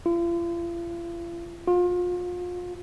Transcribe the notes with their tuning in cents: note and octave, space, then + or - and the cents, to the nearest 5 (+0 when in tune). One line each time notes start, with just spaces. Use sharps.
F4 -40
F4 +35